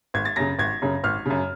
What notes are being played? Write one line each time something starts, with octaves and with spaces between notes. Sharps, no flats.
G#1 G#6
A6
F#2 C#3 A#6
G#1 G#6
F#2 C#3
G#1 F6
F#2 C#3